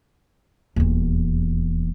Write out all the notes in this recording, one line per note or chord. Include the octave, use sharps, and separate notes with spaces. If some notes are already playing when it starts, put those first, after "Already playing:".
D#1 E2